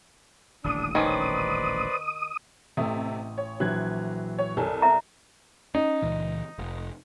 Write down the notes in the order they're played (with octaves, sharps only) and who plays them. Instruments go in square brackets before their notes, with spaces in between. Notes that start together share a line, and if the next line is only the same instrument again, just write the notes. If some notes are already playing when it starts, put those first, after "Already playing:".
[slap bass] D#1 A1 D3 [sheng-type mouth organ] D4 [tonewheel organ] D#6
[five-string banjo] D#3 C#4 [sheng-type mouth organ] B4 C5 D5
[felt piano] A1 D#6 [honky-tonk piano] C3 A3
[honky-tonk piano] C#5
[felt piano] A#1 E3 F#3 [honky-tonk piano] F#6 G#6
[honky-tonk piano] C#5
[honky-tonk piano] C2 [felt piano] A4 A#4 G#5
[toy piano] E5 A#5
[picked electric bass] C#4 [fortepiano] D#4
[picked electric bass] C#2 A#2 E3
F1